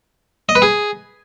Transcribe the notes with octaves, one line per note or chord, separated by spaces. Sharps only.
D#5
B4
G#4